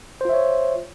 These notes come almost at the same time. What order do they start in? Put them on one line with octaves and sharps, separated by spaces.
C5 F4 E5 C#5